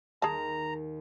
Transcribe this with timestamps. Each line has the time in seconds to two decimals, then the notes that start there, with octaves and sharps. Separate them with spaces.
0.22 D#2 G#4 A5 A#5